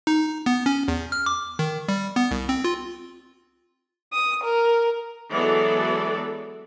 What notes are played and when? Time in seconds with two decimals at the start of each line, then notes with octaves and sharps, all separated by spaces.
0.07 D#4
0.46 B3
0.66 C#4
0.88 E2
1.12 F6
1.26 D6
1.59 D#3
1.88 G3
2.16 B3
2.31 C2
2.49 C4
2.64 F4
4.13 D#6
4.44 A#4
5.30 E3 F#3 G#3 B3 A4 D5